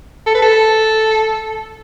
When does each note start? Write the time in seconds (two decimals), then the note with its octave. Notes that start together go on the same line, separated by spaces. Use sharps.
0.26 A4
0.35 B4
0.42 A4